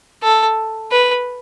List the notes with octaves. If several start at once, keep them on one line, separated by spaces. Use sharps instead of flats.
A4
B4